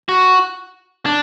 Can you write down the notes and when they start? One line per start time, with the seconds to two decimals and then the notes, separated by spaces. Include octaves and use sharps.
0.09 F#4
1.05 D4